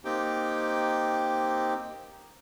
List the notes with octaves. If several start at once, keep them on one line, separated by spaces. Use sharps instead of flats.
A#3 C4 D#4 G4 G5